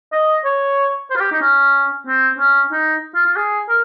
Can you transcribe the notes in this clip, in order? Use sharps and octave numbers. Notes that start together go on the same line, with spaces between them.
D#5
C#5
C5
F4
G4
D#4
C#4
C4
C#4
D#4
F4
F4
G#4
A#4